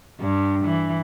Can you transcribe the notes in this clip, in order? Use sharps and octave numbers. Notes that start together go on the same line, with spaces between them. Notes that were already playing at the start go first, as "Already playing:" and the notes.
G2
E3